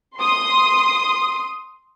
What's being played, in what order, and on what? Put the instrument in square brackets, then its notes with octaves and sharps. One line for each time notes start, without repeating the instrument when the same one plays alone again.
[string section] C6 D#6